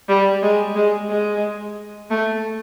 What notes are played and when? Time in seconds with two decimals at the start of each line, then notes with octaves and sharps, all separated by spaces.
0.09 G3
0.42 G#3
0.76 G#3
1.09 G#3
2.10 A3